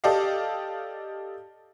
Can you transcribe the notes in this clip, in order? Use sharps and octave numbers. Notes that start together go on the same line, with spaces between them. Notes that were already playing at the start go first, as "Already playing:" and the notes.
G4 A4 D5 D#5 F5